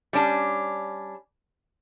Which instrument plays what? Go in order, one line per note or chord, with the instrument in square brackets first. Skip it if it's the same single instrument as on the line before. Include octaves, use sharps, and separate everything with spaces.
[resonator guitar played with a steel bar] G3 C#4 D4